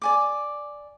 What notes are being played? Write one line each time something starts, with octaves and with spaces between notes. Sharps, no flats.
D5 G#5 D6